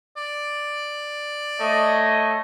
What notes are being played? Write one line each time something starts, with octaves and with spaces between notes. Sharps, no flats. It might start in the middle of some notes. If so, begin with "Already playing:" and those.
D5
A3 C#5 D#5